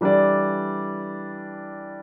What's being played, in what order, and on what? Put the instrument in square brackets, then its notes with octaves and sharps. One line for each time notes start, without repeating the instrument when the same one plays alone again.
[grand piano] E3 G3 D4 A4 D5